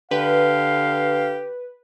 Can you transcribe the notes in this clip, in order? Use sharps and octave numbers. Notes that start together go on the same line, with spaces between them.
D3 G4 B4 F5